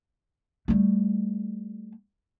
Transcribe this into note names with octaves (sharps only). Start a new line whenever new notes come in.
G3 A3